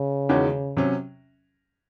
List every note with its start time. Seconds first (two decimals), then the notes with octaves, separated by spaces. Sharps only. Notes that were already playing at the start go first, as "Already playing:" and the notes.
Already playing: C#3
0.29 E2 D#3 G#3 C#4 F#4
0.77 C3 F#3 C#4